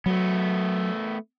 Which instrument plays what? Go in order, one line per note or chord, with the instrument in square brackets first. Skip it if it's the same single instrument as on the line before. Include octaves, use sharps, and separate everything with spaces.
[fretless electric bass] F#3 [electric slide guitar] A3 B3